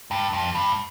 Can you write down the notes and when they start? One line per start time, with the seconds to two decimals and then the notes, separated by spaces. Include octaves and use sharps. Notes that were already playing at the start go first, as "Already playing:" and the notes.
0.11 G2
0.33 F2
0.55 G2